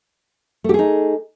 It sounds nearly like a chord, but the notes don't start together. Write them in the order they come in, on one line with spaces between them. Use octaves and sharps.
A3 G4 G#4 D#4